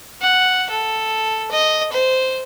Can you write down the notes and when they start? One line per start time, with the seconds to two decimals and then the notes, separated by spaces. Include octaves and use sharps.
0.21 F#5
0.70 A4
1.51 D#5
1.92 C5